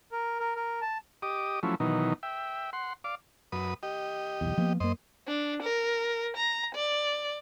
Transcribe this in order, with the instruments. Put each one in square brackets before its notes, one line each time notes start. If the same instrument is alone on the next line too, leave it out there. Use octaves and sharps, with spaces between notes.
[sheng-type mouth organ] A#4
A#4
A#4
A5
[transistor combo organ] G4 D#5 D6 D#6
F3 F#3 A3 C#4 E4
B2 D#3 E3 F#3 D#4
E5 G5
F#5 C6
D5 F5 D6
F#2 B4 D#6
G4 D#5
[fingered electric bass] B1 E2
F3 A#3 B3
[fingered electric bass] F#2 A#3 [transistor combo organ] C5 D#5
[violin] D4
A#4
A#5
D5